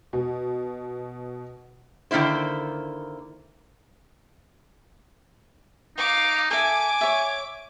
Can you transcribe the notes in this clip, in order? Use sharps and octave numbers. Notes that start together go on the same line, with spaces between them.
B2
D3 D#3 A#3 E4 C5
D#4 F5 D6
A4 E5 G#5 D6
C#5 E5